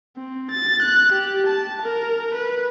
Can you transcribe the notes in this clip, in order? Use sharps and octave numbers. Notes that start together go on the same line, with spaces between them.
C4
A6
F#6
G4
A5
A#4
B4